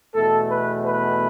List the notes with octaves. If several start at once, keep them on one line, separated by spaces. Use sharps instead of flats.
E2 B2 A3 A4
B4
B4